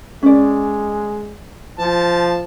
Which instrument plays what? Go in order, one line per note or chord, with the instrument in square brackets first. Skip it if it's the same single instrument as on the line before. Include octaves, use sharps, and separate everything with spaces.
[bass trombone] G#3 [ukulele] C#4 D5
[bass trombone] F3 [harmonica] A5